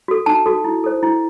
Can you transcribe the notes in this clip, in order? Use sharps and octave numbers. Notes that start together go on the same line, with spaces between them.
F#4 A4
D#4 A5
F#4 A4
E4
A4 C5
E4